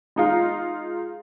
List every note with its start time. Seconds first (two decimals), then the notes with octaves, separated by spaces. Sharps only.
0.16 G#3 D#4 F4